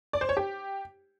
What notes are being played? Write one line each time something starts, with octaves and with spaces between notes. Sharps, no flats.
D5
C5
C#5
G4